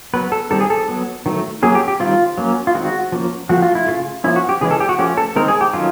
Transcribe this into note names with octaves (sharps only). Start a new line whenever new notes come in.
F#3 B3 B4
A4
D#3 G3 C4 A4
G#4
A4
F#3 B3
D#3 F#3 A3
F#3 A#3 C#4 G#4
G4
G4
D#3 G3 C4 F4
F#3 A#3 C#4
F4
D#3 G#3 C4 F#4
F3 A#3 C#4
F3 A3 C4 F#4
F4
E4
C#3 F3 A3 F4
F3 A#3 C#4 E4
F#4
G4
C#3 E3 G#3 C#4 G#4
A4
G4
F#4
F3 A3 C#4 G4
A4
D#3 G#3 C4 A#4
G#4
G4
D#3 F#3 A3 C#4 F4